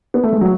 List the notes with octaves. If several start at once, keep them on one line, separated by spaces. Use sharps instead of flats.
B3
A3
G#3
F#3